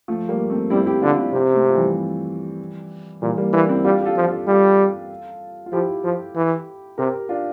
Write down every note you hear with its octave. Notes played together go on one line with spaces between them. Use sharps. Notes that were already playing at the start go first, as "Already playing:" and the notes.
F3 A3
G3 A#3
A3 C4
G3 C4 E4
E4 G4
D3 D4 F4
C4 E4
C3
A3 C4
F3
E3 G3
A#2 E3 G3
G3 A#3
E3 A#3 D4
C4 E4
G3 D4 F4
G4
F4 A4
F3
F4 A4
G3 F4 A4
F4
F3 E4 G4
F3
E3
C3 G4 A#4
D4 F4